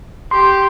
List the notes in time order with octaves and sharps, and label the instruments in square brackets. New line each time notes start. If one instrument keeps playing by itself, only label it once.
[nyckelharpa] G4 [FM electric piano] C6